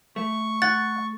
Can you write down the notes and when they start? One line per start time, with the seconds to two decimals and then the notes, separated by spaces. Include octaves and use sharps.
0.16 A3 C#6
0.62 F#5 A6